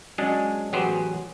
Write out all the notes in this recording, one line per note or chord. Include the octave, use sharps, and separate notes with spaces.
F#3 G#3 C#4 D4 G#4
A1 F#3 B3 G4 G#4 C5